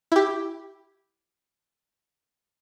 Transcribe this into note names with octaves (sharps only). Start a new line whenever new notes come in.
E4 G4